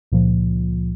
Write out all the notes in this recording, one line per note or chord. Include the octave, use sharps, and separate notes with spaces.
C#2 A#2 C#3 F3